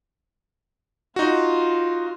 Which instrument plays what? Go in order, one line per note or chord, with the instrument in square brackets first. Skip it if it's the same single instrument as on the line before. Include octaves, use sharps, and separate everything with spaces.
[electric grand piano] D#4 F#4 [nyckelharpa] F4